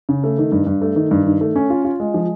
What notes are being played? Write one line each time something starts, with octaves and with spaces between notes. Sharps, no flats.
C#3
A3
D#3
G2
G2
A3
D#3
G2
D#3
A3
C#4
F4
F4
G#3
F3